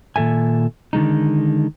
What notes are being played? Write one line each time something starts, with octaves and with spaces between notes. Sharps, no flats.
A#2 D#3 A4 E5 G#5
D3 D#3 G#3 D#4